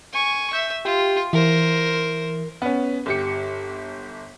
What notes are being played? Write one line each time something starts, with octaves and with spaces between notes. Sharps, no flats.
G#5 C#6
E5 G6
F4 G4
E3 A#4 C5
B3 C#4
G1 G4 C#7